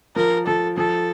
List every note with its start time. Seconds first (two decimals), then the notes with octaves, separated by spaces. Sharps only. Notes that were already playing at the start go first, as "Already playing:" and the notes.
0.16 F3 A#4
0.46 F3 A4
0.77 F3 A4